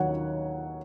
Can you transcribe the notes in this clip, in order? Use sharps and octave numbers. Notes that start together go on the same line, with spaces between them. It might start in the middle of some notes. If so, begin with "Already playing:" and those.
Already playing: D#2 D#3 F#3 C#5 F#5